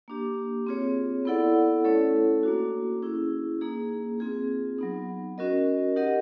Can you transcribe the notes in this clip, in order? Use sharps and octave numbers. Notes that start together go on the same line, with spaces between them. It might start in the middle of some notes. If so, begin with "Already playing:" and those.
A#3 D4 G4
C4 F4 G#4 C#5
B3 E4 A4 D5 F#5
A3 C#4 E4 A4 C#5
A#3 D4 F#4
C#4 E4 G#4
A#3 D#4 G#4
C4 F4 G#4
F#3 B3 D#4
C#4 F#4 A#4 D#5
D#4 G4 A#4 D#5 F#5